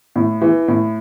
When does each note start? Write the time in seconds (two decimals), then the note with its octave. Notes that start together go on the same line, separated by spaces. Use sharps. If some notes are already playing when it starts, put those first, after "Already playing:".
0.16 A2
0.41 E3
0.68 A2